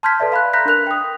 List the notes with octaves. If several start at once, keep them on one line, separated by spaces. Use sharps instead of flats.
A5 C6 F6 G6 G#6 B6
A4 B4 D5 E5
F5 B5 C6 F#6
A#5 B5 F#6 G6 A#6 B6
D4 A#4 F#6 F7
G5 D#6